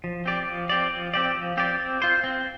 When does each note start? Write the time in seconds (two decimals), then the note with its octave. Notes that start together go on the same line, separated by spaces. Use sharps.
0.04 F3
0.26 C4 G4 D5
0.47 F3
0.69 C4 G4 D5
0.91 F3
1.14 C4 G4 D5
1.35 F3
1.57 C4 G4 D5
1.80 C4
2.02 F4 C5
2.24 C4